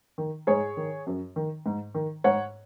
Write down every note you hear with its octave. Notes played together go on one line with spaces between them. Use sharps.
D#3
G#2 G#4 C#5
D#3
F#2
D#3
G#2
D#3
G#2 C#5 F#5